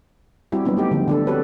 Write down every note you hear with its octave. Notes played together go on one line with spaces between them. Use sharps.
G3 C4 E4 F#4 G4
F#3 G3 A#3 B3 D4
A3 D#4 G4
D3 F3 B3
D3 D4 A4
C4 F#4 G4 A4 B4 C#5